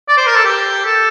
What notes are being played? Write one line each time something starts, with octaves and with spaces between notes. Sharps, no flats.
D5
C5
A#4
A4
G4
A4